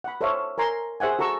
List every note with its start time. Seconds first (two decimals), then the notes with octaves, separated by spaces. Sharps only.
0.04 F#5 B5
0.21 A4 C5 C#5 E5 F5
0.58 A#4 G#5 A#5 C6
1.00 G#4 C5 E5 F#5 G#5
1.19 F#4 A4 A#5 C#6 E6